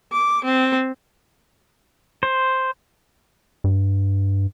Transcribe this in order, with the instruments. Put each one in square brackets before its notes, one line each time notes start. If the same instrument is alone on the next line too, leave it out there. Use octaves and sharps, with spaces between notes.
[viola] D6
C4
[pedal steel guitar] C5
[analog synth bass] G2